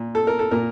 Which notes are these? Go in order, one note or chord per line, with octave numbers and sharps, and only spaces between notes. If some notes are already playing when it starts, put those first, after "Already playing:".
Already playing: A#2
A4
A#4
A4
A#2 A#4